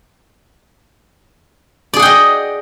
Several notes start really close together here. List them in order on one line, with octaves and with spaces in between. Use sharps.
D5 G#4 F#5 G5 D#5